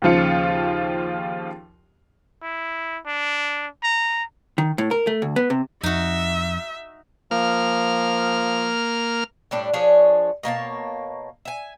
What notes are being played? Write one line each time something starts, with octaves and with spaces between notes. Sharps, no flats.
D#2 C#3 F3 F4 C#7
E4
D4
A#5
D#3
A2
A#4
A3
D2
B3
C3
F2 D#4 F#4 E5
F3 A#3 F6
A2 G3 D4
F3 D4 G#4 C#5
B2 A#3 C#5 A5
E5 G#5